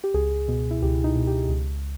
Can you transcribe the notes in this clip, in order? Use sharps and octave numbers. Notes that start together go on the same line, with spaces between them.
G4
C#2 G#4
B2
E4
C#2 G4
D#4
B2
G4
C#2